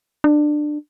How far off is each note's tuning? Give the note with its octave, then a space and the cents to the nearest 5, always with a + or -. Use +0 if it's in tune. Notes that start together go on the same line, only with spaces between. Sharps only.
D4 +20